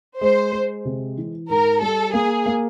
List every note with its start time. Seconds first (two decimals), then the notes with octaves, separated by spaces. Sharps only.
0.21 G#3 C5
0.52 G#3
0.85 C3
1.18 E3
1.49 G#2 A#4
1.81 G3 A4
2.14 A#3 G#4
2.46 A#3